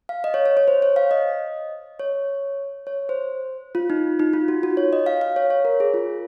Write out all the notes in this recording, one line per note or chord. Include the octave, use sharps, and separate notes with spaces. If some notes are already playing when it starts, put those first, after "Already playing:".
F5
D#5
C#5
C#5
C#5
C5
C#5
F5
D#5
C#5
C#5
C5
F4
D#4
D#4
F4
F#4
F#4
C#5
D#5
F5
F5
C#5
C#5
A#4
G#4
F4